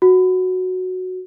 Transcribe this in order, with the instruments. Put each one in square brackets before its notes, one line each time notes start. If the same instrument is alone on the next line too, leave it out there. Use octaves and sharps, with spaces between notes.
[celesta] F#4